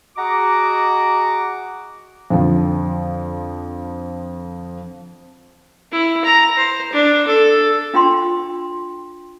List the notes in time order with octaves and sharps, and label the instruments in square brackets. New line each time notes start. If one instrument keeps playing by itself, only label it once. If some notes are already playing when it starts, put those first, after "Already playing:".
[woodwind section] F#4 G#4 D#5 F#5 A#5 D6
[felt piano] F2 D3 F3
[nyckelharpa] E4
A#5
C5
D4
A4
[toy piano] D4 F4 G5 C6